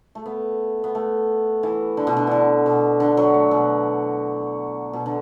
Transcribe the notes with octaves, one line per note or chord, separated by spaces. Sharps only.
A3
B3
B3
A3
E3
D3
B2
D3
D3 E3
B2
D3
F#3
A3
B2
B2
D3